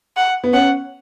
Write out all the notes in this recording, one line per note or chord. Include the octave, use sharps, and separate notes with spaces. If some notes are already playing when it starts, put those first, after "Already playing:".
F#5
B3
C#4 F#5